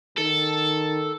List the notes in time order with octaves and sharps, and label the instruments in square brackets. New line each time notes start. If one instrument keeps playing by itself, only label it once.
[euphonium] D#3 [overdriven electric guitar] A4